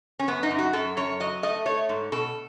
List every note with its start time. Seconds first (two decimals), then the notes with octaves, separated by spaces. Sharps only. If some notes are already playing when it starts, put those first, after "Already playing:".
0.19 C#4
0.28 F#2 B3
0.43 D#4
0.51 F#2
0.59 F#4
0.73 F#2 A4
0.97 F#2 C#5
1.20 F#3 D#5
1.43 A3 D#5
1.66 A3 C#5
1.89 G#2
2.12 B2 A4